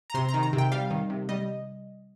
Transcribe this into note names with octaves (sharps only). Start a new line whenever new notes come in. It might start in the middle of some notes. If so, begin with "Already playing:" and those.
A#5
C3 C6
A#5
D#3
A#5
C3
G5
G3 F5
D#3
C3
G3 D#5